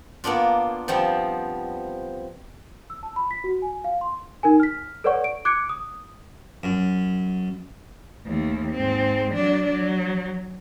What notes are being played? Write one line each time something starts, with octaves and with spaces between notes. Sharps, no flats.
A#3 B3 D4 F4
F3 G3 B3 C4
E6
A5
B5
B6
F#4
G#5
F5
C6
D#4 A#4 G#5
F6 B6
A4 B4 C#5 D5 F#5 C#6
D7
D6 F#6 G#6 C#7 D7
D#6
F#2
D#2 A3
G#2 C4
F#3 D4
F#3